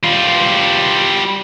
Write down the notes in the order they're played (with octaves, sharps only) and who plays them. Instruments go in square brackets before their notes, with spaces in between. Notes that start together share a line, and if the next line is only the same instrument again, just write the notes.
[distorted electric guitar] G3 F4